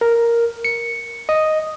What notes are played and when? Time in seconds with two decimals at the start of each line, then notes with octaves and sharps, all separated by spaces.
0.01 A#4
0.65 C#7
1.29 D#5